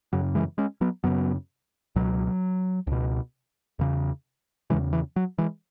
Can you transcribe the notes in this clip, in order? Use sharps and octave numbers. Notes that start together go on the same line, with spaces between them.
F#2 C#3 F#3
E3 G#3
G#3 C#4
F#3 B3
F#2 C#3 F#3 B3
C#2 B2 F#3
C#2 B2
E2 C#3
E2 C#3 E3 G#3
E3
F#3
E3 G#3